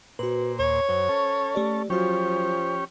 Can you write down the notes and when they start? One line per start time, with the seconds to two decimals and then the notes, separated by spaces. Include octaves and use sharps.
0.19 A#2 F#4 B4 C5
0.59 D#2 C#5
0.89 F#2 C5
1.09 C#4 A4
1.55 A3 G4 D5
1.90 F3 F#3 C#4 F#4 G4 C#5